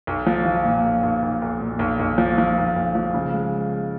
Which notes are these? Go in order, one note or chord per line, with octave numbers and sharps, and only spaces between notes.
B1
F3
F3
A#2
B1
B1
B1
B1
A#2
B1
B1
F3
F3
B1
B1
F3
C#3
G#3